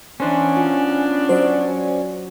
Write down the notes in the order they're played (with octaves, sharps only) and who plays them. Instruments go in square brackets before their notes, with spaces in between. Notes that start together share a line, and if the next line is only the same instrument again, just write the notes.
[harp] E3 B4 C5 [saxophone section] B3 D4 [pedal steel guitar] C#4
[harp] F4
[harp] F#3 [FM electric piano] C5 D5